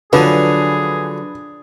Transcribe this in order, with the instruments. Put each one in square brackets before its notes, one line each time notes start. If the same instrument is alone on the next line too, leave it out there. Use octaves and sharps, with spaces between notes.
[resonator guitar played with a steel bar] D3 [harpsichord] F3 F#3 G#5 [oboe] G#4 [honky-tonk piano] B4